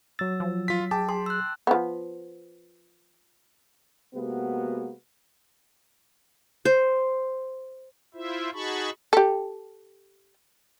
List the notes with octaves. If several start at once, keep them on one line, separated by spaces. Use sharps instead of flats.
F#3 E6 A6
F3
F4 B6
G#4 G5 A5 D6
G#4 C6
E6 F#6
F3 B3
C3 G#3 A#3 B3 F#4
C5
E4 F4 C5 E5
D#4 F#4 G#4 A5 B5 C#6
G4 A4